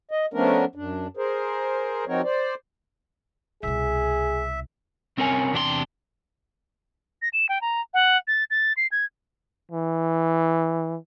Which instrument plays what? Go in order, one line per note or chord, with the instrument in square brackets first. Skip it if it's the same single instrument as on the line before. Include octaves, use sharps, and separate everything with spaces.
[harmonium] D#5
F3 A3 B3 C#4 D4 A#4
F#2 D4
G#4 A#4 C5
F3 C4 D#4 F#4 A#4 C#5
C5 D5
[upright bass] C2 B2 [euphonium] G#4 [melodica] E5
[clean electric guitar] C2 C4 C#4 A#4 C#5 G#5
E2 C3 D4 G4 G#4 C6
[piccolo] A#6
E7
G5
A#5
F#5
A6
A6
C7
G#6
[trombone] E3